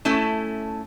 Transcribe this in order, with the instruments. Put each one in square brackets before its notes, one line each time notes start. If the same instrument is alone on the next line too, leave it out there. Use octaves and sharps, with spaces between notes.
[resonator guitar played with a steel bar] A3 C#4 E4 A4